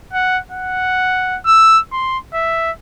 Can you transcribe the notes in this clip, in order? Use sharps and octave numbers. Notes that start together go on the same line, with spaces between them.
F#5
F#5
E6
C6
E5